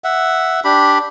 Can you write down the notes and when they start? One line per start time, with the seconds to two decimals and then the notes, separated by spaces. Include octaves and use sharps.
0.04 E5 F#5
0.64 D4 G4 B5